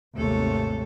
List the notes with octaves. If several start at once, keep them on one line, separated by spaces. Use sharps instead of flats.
G#1 D#2 C3 A3 A4 C#5